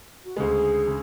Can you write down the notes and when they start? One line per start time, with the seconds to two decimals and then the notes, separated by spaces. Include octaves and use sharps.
0.25 F#4
0.36 D2 C#3 G#3 G#4
0.87 C#3